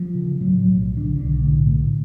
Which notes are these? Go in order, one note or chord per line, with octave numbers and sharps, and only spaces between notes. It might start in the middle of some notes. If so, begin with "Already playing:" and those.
Already playing: F3
C#3
A2 F#3
F#3
B1
B1
D3
B1 D3
A2
A2